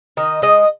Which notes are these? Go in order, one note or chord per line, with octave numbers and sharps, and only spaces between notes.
D#3 D#5
G#3 D#5